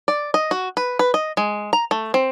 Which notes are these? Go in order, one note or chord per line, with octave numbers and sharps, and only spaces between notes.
D5
D#5
F#4
B4
B4
D#5
G#3
A#5
A3
C4